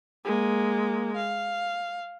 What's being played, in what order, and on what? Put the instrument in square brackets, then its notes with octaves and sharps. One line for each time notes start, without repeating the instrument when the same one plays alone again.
[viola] G#3 A#3
F5